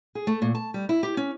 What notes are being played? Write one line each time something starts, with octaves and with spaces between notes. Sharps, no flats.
G#4
A3
A#2
A5
G3
E4
G4
C#4